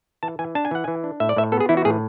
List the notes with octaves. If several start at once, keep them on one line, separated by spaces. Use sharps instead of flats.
E3 A5
E3 G#5
D4 A5
G#5
E3 F#5
E3 G#5
D4
A2 E5
D5
A2 E5
B3 A4
G#4
E3 E4
F#4
A2 G#4